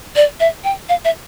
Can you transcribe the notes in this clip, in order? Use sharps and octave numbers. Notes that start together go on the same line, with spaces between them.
D5
E5
G5
F5
E5